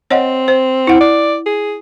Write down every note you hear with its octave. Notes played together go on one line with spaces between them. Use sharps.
C4 C#5 D#5 F#5
C5
E4 F#5
D5
G#4